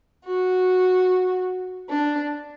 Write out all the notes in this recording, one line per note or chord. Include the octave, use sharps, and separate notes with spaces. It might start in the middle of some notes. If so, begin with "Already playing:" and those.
F#4
D4